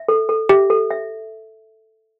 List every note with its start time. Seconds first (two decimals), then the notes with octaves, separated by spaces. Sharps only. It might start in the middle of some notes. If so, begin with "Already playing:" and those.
Already playing: E5
0.08 A4
0.29 A4
0.49 G4 E5
0.70 A4
0.91 E5